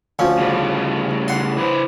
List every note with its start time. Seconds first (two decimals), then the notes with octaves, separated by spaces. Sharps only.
0.19 D2 F3 C#4
0.38 A2 C#3 G3
1.28 F#5 C6
1.58 E4 B4 C5